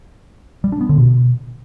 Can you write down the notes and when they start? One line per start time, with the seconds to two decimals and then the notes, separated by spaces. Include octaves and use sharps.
0.64 G3
0.72 D4
0.81 B3
0.89 D3
0.98 B2